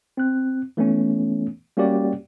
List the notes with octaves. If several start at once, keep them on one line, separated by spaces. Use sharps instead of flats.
C4 F#6
E3 A3 B3 C#4
G3 A#3 C#4 F#4 G4 D5